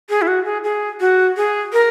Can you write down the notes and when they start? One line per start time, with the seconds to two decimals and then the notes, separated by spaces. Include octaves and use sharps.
0.09 G#4
0.22 E4
0.27 F#4
0.45 G#4
0.64 G#4
1.00 F#4
1.37 G#4
1.73 A#4